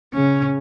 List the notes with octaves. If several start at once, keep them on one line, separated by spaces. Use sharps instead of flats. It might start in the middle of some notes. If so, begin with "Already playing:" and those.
C#3 C#4